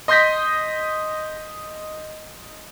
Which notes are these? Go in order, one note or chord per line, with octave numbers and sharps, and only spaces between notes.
D#5 C6 D#6 G6 A#6 B6